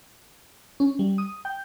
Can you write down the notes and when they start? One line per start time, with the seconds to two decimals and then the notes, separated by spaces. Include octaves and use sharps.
0.80 C#4
0.99 G3
1.18 D#6
1.45 G5